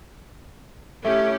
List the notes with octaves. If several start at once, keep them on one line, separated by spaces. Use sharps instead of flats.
A3 C#4 E4 G4